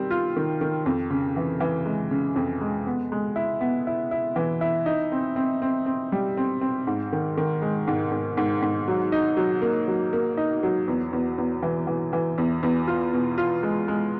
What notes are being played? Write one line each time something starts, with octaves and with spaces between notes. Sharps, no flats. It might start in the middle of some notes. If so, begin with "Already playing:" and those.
Already playing: D#3 G3 C4
F4
D#3
D#3
F2
C#3
E3
E3
G#3
C#3
F2
G#3
B3
G#3
E4
B3
E4
E4
E3
E4
D#4
C4
C4
C4
C4
G3
C4
C4
G#2
D#3
D#3
G#3
G#2
G#2
G#2
G#2
F#3
D#4
F#3
A#3
F#3
A#3
D#4
F#3
E2
E2
E2
E3
E3
E3
E2
E2
F4
B2
F4
G#3
G#3